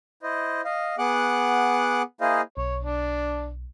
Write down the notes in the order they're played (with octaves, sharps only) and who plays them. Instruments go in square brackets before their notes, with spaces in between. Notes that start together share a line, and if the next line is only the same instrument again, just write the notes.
[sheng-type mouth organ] E4 C5 D#5
D#5 F5
B3 G#4 F#5 D6 F#6
A#3 E4 G#4 C5 D#5 F5
[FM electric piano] B1 [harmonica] C#5
[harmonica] D4